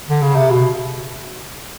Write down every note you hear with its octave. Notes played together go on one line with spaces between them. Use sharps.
D3
C#3
C3
B2